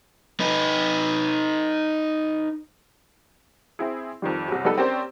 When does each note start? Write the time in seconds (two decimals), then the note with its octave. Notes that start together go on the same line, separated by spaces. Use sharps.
0.40 D#4 B4
3.79 C4 E4 G#4
4.22 F2 D#3 G3
4.48 C2 F#2
4.65 G3 B3 D#4 A4 B4
4.78 C4 C#4 G4 A#4 C5 D5